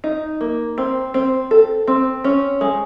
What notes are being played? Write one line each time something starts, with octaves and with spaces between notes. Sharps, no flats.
D#4
A#3
C4
C4
A4
C4
C#4
G#3